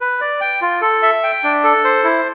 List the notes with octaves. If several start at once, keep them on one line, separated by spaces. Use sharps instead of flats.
B4
D5
G5
F4
A4
E5
G5
D4
A4
C5
E4